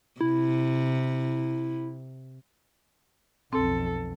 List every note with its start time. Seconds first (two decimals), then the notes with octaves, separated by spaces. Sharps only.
0.21 C3 E4
3.53 B1 F2 C4 A4